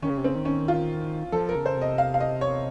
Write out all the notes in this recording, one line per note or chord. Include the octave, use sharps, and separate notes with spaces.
D#3 C#4
C#3
C3
C#3 C4
D#3
C#4
F4
F3 A4
A#4
C#3
C5
C3 D#5
F5
F5
D#5
C#5